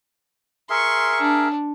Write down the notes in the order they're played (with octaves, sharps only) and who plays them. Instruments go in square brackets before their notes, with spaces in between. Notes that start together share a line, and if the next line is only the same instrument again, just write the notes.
[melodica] G#4 A#4 E5 [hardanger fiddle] C6 C#6
[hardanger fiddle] D4